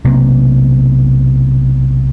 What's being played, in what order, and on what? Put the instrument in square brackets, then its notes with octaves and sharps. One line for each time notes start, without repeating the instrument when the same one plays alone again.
[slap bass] B1 C3 A#3